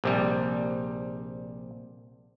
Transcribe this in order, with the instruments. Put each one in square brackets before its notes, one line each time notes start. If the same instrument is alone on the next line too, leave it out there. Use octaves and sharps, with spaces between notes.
[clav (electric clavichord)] A#1 C3 G3